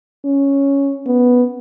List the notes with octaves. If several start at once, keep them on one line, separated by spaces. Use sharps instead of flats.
C#4
B3